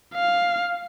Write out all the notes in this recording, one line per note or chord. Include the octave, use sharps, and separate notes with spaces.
F5